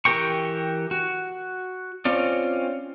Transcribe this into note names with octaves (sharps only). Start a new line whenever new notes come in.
E3 G4 A#4 G5 C#6
F#4
C4 C#4 F4 D5